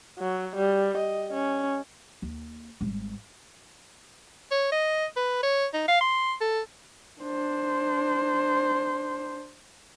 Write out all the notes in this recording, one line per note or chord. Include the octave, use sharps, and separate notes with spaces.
F#3
G3
D#5
C#4
D#2
G#1 G3
C#5
D#5
B4
C#5
D#4
F5
C6
A4
D4 C5